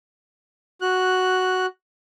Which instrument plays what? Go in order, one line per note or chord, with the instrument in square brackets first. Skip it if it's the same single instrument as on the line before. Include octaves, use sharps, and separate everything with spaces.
[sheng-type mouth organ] F#4 F#6